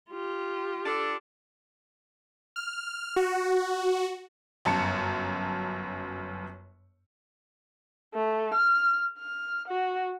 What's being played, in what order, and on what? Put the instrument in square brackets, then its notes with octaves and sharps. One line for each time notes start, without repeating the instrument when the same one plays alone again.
[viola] F4 G4
[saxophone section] D4 A4
[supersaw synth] F6
F#4
[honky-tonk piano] G1 F#2 A5 C#7
[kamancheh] A3
F6
F6
F#4